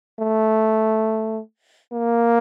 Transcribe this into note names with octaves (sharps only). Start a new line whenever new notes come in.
A3
A#3